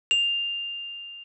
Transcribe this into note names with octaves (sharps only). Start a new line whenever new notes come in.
F7